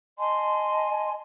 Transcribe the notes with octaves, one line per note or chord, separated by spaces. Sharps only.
D#5 G#5 A5 C6